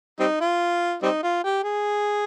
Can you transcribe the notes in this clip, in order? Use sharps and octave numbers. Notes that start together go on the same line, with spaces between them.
G3 C4 D#4
F4
G3 C4 D#4
F4
G4
G#4